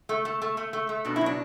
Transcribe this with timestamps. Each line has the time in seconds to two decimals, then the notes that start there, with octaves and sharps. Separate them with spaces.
0.09 A3
0.25 A3
0.42 A3
0.57 A3
0.73 A3
0.89 A3
1.05 B2 D4
1.16 E4
1.21 F#3
1.26 D4